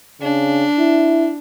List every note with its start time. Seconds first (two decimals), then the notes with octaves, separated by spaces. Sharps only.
0.21 C#3 D4
0.79 E4